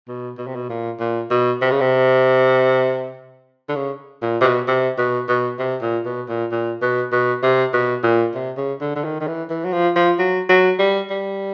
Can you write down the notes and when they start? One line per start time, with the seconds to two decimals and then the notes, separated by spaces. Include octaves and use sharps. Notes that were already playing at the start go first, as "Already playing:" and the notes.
0.08 B2
0.38 B2
0.47 C3
0.56 B2
0.69 A#2
1.00 A#2
1.31 B2
1.62 C3
1.72 C#3
1.81 C3
3.69 D3
3.76 C#3
4.22 A#2
4.41 C3
4.44 B2
4.68 C3
4.98 B2
5.29 B2
5.59 C3
5.82 A#2
6.05 B2
6.29 A#2
6.52 A#2
6.82 B2
7.12 B2
7.43 C3
7.73 B2
8.04 A#2
8.35 C3
8.57 C#3
8.81 D3
8.96 D3
9.04 D#3
9.20 D#3
9.27 E3
9.50 E3
9.64 F#3
9.73 F3
9.96 F3
10.19 F#3
10.49 F#3
10.79 G3
11.10 G3